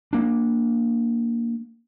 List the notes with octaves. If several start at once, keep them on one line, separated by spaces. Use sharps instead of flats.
A#3 D4